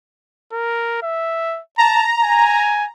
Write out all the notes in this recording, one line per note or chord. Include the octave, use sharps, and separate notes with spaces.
A#4
E5
A5 A#5
G#5